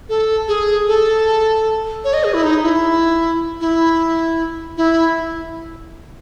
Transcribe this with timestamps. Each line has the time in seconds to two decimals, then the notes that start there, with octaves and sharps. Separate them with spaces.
0.09 A4
0.48 G#4
0.88 A4
2.04 C#5
2.14 D#5
2.24 G#4
2.34 E4
2.43 D#4
2.63 E4
3.61 E4
4.77 E4